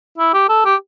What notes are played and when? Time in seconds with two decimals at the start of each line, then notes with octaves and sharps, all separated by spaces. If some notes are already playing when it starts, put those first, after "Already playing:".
0.18 E4
0.34 G4
0.49 A4
0.65 G4